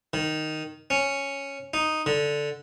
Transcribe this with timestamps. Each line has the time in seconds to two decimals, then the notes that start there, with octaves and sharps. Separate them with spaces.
0.13 D#3
0.90 C#4
1.74 D#4
2.06 D3